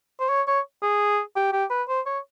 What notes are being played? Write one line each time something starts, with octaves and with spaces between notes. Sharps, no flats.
C5
C#5
C#5
G#4
G4
G4
B4
C5
C#5